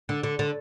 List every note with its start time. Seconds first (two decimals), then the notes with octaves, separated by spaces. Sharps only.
0.09 D3
0.23 D3
0.39 D3